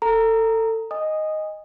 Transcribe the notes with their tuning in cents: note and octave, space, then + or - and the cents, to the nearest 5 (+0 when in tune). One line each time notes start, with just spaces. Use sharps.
A4 +25 A#5 +0
D#5 +0 G#5 -30 D#6 -10